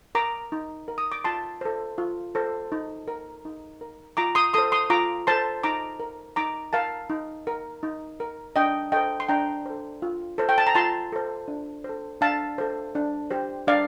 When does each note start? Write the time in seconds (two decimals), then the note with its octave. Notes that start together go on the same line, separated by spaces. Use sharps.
0.15 A#4 A#5 D6
0.52 D#4
0.88 A#4
0.98 D#6
1.12 D6
1.24 F4 A5 C6
1.61 A4 C5
1.98 F4
2.35 A4 C5
2.72 D#4
3.08 A#4
3.45 D#4
3.81 A#4
4.17 F4 A#5 D6
4.35 C6 D#6
4.53 A4 C5 C6 D#6
4.72 C6 D#6
4.90 F4 A#5 D6
5.27 A4 C5 A5 C6
5.63 D#4 A#5 D6
6.00 A#4
6.36 D#4 A#5 D6
6.73 A#4 F5 A5
7.10 D#4
7.47 A#4
7.83 D#4
8.20 A#4
8.56 D4 D#5 G5
8.92 A4 C5 D#5 G5
9.20 C6
9.29 D4 G5 A#5
9.66 A4 C5
10.02 F4
10.38 A4 C5
10.49 G5
10.58 A5
10.67 A#5
10.75 F4 A5 C6
11.12 A4 C5
11.48 D4
11.84 A4 C5
12.21 D4 F5 A5
12.58 A4 C5
12.95 D4
13.31 G4 C5
13.67 D4 D5 F5